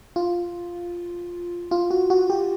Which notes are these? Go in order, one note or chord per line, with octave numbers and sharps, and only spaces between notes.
F4
F4
F#4
F#4
G4